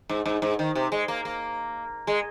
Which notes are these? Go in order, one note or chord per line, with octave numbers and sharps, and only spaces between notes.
G#2
G#2
G#2
D#3
C3
G#3
A#3
A#3
G#3